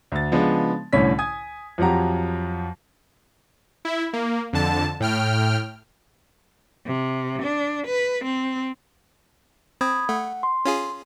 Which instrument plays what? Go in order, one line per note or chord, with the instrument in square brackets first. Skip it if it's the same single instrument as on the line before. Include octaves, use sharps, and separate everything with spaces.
[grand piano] D2 A6
C#3 F3 G#3 B3 D4
C2 A2 D3 C#4 C#5 B6
G#5 D#6 G#6
F2 F3 F#3 G4 F#5 A#5
[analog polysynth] E4 E5
A#3
F2 D3 A5
A2 G5 F6
[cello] C3
D4
B4
C4
[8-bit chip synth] C4 [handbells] B5 D#6 G#6
[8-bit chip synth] A3 [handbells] F#5
[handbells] C6
[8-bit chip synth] C#4 F4 G#4